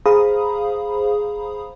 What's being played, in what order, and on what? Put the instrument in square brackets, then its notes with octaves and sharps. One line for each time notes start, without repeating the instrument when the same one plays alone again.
[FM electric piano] G#4 C5 F5 A#5 B5 D#6